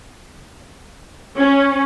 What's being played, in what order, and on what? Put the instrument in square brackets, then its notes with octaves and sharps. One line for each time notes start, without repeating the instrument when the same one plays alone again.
[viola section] C#4